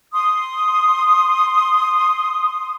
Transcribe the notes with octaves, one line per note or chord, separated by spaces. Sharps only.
C6 D#6